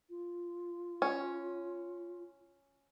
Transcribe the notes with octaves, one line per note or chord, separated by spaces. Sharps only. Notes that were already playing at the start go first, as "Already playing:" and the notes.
F4
C#4